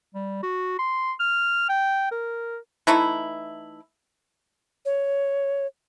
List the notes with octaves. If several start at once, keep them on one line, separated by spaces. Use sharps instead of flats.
G3
F#4
C6
F6
G5
A#4
E3 A3 D#4 E4
C#5